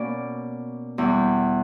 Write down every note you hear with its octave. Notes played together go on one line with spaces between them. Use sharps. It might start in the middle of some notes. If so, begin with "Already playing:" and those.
Already playing: B2 A#3 C#4 D5
E2 B2 G3